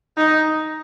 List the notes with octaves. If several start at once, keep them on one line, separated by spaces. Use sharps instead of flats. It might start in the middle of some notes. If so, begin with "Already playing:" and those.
D#4